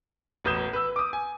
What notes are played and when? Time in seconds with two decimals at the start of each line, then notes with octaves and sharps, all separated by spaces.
0.44 E1 A1 B4 D#6 G6 E7
0.73 B4 E6
0.96 D6 D#6
1.13 G#5